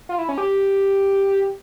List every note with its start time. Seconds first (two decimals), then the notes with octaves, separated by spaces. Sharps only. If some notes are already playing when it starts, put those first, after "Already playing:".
0.09 F4
0.18 E4
0.29 C#4
0.38 G4